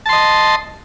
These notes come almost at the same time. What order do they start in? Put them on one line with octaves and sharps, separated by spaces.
A5 C6 D#5